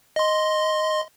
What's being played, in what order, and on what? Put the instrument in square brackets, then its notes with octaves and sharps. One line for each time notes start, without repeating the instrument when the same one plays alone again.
[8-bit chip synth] D#5 C6